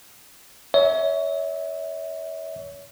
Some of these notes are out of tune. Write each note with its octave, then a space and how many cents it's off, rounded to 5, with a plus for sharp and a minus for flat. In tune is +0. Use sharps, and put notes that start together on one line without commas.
C#5 +25 E5 -30